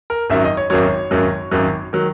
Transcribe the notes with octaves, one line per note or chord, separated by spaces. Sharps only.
A#4
G#1 F#2 D#3 F#3 E5
D#5
C#5
G#1 F#2 D#3 F#3 C#5
G#1 F#2 D#3 F#3
G#1 F#2 D#3 F#3
D#3 F#3